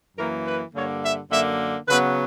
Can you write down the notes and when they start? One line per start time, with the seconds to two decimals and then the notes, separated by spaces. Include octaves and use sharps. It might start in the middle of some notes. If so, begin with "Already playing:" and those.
0.17 F#2 E3 A#3 A#4
0.46 B4
0.74 G2 D3 A#3 C#5
1.03 E5
1.30 F#2 D3 A#3 E5
1.88 C#3 F#3 B3 B4